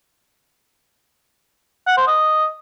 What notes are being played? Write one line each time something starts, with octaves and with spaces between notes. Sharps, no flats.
F#5
C5
D#5